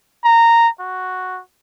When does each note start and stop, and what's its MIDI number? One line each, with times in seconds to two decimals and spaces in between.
0.24 0.68 82
0.80 1.40 66